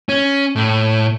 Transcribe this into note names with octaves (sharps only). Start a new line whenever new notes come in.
C#4
A2